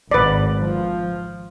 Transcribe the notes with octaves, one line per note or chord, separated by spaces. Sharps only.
G#1 B4 D5
F3